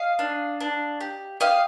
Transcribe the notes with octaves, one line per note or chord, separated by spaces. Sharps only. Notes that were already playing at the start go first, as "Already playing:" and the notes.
Already playing: D#5 F5
D4
D4
G4
G4 D#5 F5